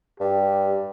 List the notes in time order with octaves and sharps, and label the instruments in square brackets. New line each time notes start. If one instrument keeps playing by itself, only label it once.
[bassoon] G2 [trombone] G4